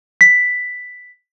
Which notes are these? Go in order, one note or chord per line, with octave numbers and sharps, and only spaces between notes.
B6